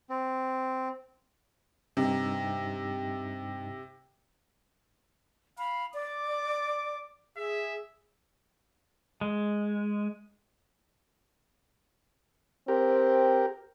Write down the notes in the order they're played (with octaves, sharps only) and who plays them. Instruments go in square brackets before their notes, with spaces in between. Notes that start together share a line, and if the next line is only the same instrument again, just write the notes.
[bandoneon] C4
[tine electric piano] G2 D#4 E6 [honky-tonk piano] C3
[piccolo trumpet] F5 [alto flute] B5
[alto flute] D5 [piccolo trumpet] D6
[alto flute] G#4 [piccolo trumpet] E5
[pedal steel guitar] G#3
[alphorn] C4 [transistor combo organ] G4 A#4